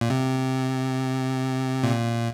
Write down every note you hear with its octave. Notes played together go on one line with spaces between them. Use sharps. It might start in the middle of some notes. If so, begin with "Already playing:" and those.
A#2
C3
A#2